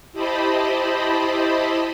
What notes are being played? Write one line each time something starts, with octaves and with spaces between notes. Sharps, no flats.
E4 G4 C5 D#5 A5 B5